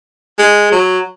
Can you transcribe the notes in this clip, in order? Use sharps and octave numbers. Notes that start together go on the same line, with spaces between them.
G#3
F#3